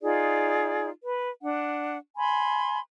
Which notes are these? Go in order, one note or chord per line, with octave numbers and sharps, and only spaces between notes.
D#4 F4 G#4 D5
B4
D4 F#5
G#5 B5 C6